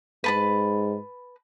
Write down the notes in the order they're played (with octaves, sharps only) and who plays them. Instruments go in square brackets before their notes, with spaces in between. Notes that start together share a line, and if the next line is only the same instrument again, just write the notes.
[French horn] G#2 [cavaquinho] B4 A5 B5